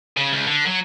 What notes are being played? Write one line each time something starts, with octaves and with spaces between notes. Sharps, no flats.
C#3
C#2
D3
F#3